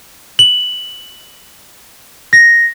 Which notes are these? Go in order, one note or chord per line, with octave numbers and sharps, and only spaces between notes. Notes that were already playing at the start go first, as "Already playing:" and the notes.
F#7
A#6